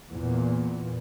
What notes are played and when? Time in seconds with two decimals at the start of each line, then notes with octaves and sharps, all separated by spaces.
0.12 E2 A#2